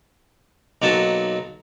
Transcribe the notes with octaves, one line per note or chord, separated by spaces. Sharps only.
B1 F#3 A#3 D#4 F#4 A5